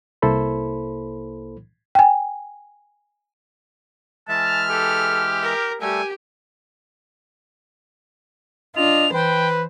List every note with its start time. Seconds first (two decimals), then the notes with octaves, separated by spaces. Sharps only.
0.22 C2 A#3 E4 A4 C5 B5
1.95 G5 G#5
4.29 E3 G#3 E5 A5 F6
4.70 G4 A4
5.43 A#4
5.81 G3 A3 G4 A4 G#5
8.76 D4 F4 D#5 F7
9.13 E3 B4 C5 G5